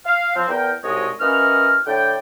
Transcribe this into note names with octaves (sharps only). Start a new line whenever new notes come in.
F5
F3 C4
E2 A#4 G5
C2 G#2 B2 G#3 C#5 D#5
E3 A#3 C#4 F#4 D#5 F6
A2 D3 D5 G5